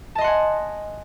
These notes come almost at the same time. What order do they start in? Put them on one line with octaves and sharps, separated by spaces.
A5 D#5 C6 F#5 G#5